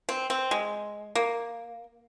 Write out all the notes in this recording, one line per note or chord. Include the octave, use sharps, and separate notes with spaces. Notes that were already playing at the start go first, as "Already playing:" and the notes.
C4
C4
G#3
A#3